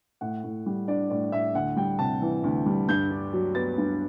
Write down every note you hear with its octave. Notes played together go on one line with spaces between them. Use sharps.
A2 F#5
A2
G3
D4 D5
A2 D5
A2 E5
D2 F#5
G3 G5
C3 A5
E3
D2
G3
G2 G6
D4
F#3
B3 A6
G2